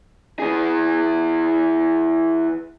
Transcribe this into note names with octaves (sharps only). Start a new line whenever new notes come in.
E3 G#4